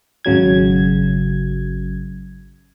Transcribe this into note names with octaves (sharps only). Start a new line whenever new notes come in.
G#1 C#3 F#3 G#6